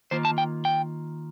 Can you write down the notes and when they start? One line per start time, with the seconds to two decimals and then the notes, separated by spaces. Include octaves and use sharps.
0.11 D#3 A#3 F4 C5
0.25 A5
0.38 G5
0.65 G5